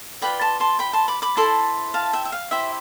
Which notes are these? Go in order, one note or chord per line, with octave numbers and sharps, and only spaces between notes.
F4 B4 D5 G5 B5
A5 C6
A5 C6
G5 B5
A5 C6
B5 D6
B5 D6
E4 A4 C5 A5 C6
F5 A5
E5 G5
E5
F5
E4 G4 C5 E5